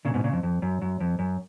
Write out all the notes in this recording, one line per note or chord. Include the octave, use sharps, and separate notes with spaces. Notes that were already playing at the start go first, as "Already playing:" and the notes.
A#2 C#3
G#2 B2
A#2 C#3
F2
F2
F#2
F#2
F2
F#2